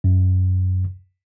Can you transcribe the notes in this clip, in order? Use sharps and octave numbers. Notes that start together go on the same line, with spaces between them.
F#2